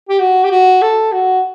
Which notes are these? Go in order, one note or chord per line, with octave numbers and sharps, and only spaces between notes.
G4
F#4
G4
F#4
A4
F#4